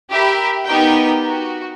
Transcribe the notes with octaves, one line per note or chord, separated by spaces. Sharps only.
G4 A#4 E5 G5 B5
B3 D#4 G4 A#4 G5
F#4